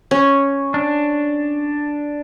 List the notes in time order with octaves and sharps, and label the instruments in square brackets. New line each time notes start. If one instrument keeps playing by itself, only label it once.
[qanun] C#4
[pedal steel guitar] D4